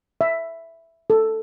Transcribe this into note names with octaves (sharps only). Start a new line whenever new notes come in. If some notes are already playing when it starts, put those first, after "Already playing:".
E5
A4